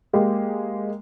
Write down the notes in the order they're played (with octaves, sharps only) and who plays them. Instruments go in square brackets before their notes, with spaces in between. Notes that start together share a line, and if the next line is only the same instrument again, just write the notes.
[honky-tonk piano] G#3 A#3 G4